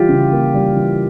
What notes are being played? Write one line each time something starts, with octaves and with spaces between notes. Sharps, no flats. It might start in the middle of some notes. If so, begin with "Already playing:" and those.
Already playing: E3 G3 F4 G4
C#3
A#3
G3
E3